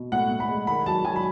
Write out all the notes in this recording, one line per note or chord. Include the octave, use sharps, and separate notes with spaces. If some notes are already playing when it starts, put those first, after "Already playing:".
Already playing: B2
A2 F#5
A2
B5
G#3
D#3 B5
F#3 A5
F#3 G#5
B5